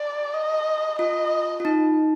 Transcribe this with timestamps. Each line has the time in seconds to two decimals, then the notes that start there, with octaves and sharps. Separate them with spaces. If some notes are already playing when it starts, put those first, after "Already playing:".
Already playing: D5
0.34 D#5
0.99 F4 D#5
1.60 F4
1.65 D#4